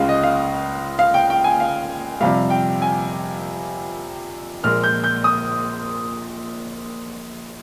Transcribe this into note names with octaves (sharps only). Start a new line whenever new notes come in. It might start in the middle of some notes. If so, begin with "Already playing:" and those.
Already playing: C#2 C#3 G#3 F5
D#5
F5
F5
G5
G5
G#5
F5
F2 C3 G3 F5
G5
G#5
A#1 A#2 G#3 F6
G6
G6
D#6